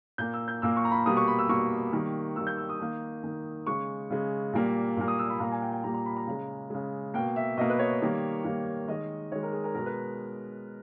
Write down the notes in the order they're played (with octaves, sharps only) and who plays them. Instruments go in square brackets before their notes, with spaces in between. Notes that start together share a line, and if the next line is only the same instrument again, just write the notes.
[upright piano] A#2 A#3 G6
E6
G6
A#2 A#3 E6
C#6
A#5
B5
B2 G3 A#3 D#6
C#6
B5
E6
B2 G3 A#3 C#6
D#3 G3 A#3
D#3 G3 A#3 E6
G6
E6
D#6
D#3 A#3
D#3 A#3
C#3 G#3 C#6
C#3 G#3
A#2 G3 A#3
A#2 G3 A#3
D#6
E6
B5
A#2 G3 A#3 A#5
G#5
G5
G5
A#2 G3 A#3 A#5
A#5
B5
A#5
C#3 G#3
C#3 G#3
B2 A#3 G5
E5
B2 A#3 D#5
B4
C#5
D#3 G3 A#3
D#3 G3 A#3
D#3 G#3 D#5
D#3 G#3 C#5
A#4
G#4
A#4
B2 G#3 A#4
B4